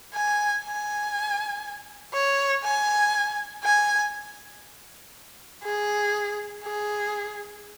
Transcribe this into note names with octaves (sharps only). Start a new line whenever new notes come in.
G#5
G#5
C#5
G#5
G#5
G#4
G#4